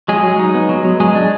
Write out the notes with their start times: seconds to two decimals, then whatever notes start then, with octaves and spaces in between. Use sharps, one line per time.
0.08 F#3 G#3 G#4
0.24 F#3
0.39 D#4
0.54 B3
0.69 F#3
0.84 F#3
1.00 F#3 G#3 G#4
1.15 D4